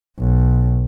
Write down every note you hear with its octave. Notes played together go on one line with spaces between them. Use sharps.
B1